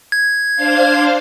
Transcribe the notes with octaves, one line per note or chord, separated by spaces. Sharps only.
G#6
D4 C5 F5